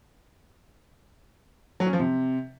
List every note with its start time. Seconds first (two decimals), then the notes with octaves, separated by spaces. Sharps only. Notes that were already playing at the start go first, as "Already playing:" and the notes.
1.80 F#3
1.87 C#4
1.93 F3
1.99 C3